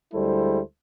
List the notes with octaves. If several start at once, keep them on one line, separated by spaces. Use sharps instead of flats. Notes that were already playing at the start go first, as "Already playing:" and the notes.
D2 G3 G#3 E4 A4 C5